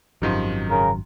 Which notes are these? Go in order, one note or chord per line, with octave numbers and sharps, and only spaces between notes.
G#1 F#2 C3 D#3 F3
C#3 A#4